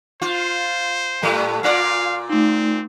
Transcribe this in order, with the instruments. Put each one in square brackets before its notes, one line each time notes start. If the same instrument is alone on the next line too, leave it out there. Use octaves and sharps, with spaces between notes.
[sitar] F4 [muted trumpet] C5
[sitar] A2 G3 A3
[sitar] A#2 F4 D5 [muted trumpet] F5
[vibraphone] A3 D#4 [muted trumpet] C4